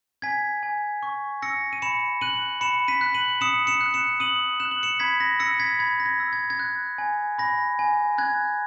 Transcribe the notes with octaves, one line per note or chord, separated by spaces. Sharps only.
G#5 G#6 B6
G#5
C#6
E6 A#6 C#7
D#7
B5 C#7 E7
F#6 D#7 F#7
B5 C#7 E7
B6 D#7
F#6
D#7 F#7
D#6 C#7 E7
C#7 E7
F#6
C#7 E7
D#6 D#7 F#7
F#6 E7
F#7
C#7 E7
B5 G#6 B6
A#6
E6 A#6 C#7
G#6 B6
B5 G#6
A#6
G#6
E6
G#6
G#6
F#6
G#5
B5 A#6
G#5
F#6 G#6